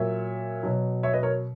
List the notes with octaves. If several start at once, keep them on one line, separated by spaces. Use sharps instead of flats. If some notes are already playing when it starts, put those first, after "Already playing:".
Already playing: A#2 F#3 C#5 E5
B2 F#3
C#5 E5
B4 D#5
A#4 C#5